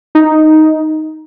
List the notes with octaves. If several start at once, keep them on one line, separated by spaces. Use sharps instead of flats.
D#4